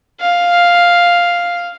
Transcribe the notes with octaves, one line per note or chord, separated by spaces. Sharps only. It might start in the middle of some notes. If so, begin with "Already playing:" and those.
F5